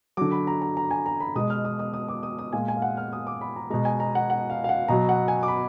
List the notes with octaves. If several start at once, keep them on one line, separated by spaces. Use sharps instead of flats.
D3 F#3 D6
B5
A#5
A#5
A#5
G#5
A#5
B5
B2 G#3 D#6
F6
D#6
D#6
D#6
D6
D#6
D#6
A#2 G#3 G#5
G#5
F5
F#5
F6
D#6
D6
B5
A#5
B2 G#3 A#5
G#5
A#5
F#5
F#5
F5
F5
F#5
B2 F#3 A#5
F#5
G#5
D6
B5